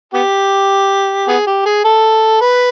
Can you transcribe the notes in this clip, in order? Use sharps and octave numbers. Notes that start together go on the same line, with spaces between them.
B3 G4
B3 G#4
G4
G#4
A4
B4